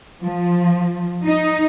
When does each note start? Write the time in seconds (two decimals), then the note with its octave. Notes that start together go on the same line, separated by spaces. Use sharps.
0.23 F3
1.24 D#4